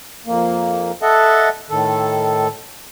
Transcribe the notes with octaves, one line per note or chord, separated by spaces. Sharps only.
F2 A#3
A4 D#5 E5 F#5 A5
A2 D#3 A4